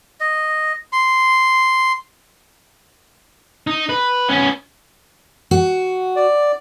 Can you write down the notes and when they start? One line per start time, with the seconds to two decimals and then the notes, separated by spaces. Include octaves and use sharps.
0.20 D#5
0.93 C6
3.67 D#4
3.89 B4
4.29 B3 C#4
5.51 F#4
6.16 D5